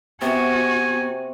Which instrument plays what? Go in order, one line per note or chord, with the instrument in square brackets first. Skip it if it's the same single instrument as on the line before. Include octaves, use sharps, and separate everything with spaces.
[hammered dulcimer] C3 [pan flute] B3 [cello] F#4 [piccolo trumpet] G#5